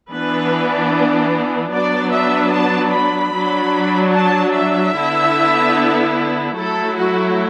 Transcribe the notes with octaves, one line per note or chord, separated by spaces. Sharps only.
E3 B3 D4 B4
F#3 B3 D4 D5
E5
A5
B5
F#3 D4
A5
E5
D3 B3 E4
F#3 A3 E4 A4
F#4